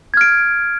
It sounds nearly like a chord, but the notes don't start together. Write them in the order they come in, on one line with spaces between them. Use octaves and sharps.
G#6 F6 D7